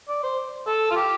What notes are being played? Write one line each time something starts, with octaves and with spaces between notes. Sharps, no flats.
D5
C5
A4
F4
G4